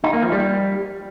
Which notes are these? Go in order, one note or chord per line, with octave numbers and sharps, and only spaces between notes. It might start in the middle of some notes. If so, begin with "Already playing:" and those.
D#4
A#3
F3
G3